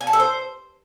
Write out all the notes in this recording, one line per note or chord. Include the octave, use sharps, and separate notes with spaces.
G#5
A5
A4
C5